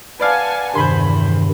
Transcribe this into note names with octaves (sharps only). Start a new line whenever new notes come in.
B4 D5 F5 F#5 G#5 A5
E2 G2 C3 D#3 C5 B5 C6